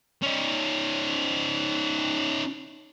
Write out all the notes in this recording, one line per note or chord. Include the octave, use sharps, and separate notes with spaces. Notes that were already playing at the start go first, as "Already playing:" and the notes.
C#4 D#4